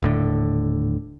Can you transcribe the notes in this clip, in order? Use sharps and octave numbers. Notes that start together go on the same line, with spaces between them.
D#1 A2 D3